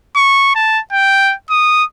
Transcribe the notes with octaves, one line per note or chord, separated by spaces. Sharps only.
C#6
A5
G5
D#6